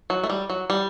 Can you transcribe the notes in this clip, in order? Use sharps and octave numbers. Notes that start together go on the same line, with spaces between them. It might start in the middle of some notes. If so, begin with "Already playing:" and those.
F#3
A3
G3
F#3
G3